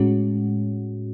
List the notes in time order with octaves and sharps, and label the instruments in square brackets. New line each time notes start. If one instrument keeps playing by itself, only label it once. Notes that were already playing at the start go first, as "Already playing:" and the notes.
Already playing: [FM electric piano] A2 G#3 C#4 F#4